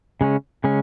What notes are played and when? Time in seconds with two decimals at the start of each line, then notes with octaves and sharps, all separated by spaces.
0.21 C#3 G#3 C#4
0.64 C#3 G#3 C#4